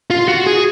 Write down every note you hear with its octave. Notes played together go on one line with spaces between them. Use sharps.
F4
F#4
G#4